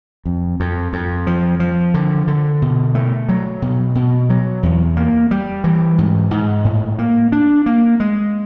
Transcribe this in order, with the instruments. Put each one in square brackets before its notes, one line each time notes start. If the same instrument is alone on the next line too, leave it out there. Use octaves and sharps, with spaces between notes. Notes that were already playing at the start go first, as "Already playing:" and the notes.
[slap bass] F2
F2
F2
F3
F3
D3
D3
B2
A3
F#3
B2
B2
F#3
E2
A#3
G3
E3
G#2
G#2
A2
A#3
D4
A#3
G#3